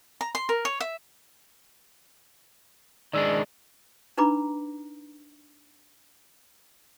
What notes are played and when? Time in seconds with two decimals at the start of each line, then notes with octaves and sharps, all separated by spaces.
0.21 A#5
0.35 C6
0.49 A#4
0.65 C#5
0.80 E5
3.13 D#3 G#3 D4 D5 E6
4.17 D4 D#4 B4 A#5 B5 D6